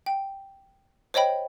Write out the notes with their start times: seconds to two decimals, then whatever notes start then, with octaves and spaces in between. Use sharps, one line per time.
0.06 G5
1.14 C5 C#5 D#5 G5 B5